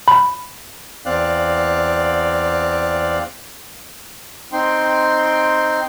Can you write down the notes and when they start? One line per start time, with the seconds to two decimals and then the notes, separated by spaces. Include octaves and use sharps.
0.08 B5
1.06 E2 C4 D5 F5 F#6
4.52 C4 D#4 G5 C6